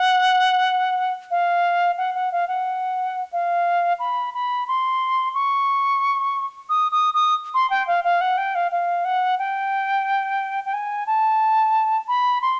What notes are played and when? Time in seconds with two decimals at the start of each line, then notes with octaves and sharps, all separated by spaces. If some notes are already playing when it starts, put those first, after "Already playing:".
Already playing: F#5
1.31 F5
1.98 F#5
2.15 F#5
2.32 F5
2.48 F#5
3.33 F5
3.99 B5
4.34 B5
4.68 C6
5.34 C#6
6.69 D#6
6.92 D#6
7.14 D#6
7.54 C6
7.70 G5
7.87 F5
8.04 F5
8.21 F#5
8.37 G5
8.55 F5
8.71 F5
9.05 F#5
9.39 G5
10.65 G5
10.73 G#5
11.07 A5
12.08 B5
12.42 C6